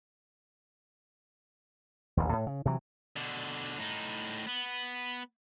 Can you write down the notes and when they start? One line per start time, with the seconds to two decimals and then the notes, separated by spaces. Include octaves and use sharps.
2.17 A1 D#2
2.32 A2
2.47 C#3
2.65 C3 E3 F#3
3.16 B2 D3
3.78 A2 D#4
4.47 B3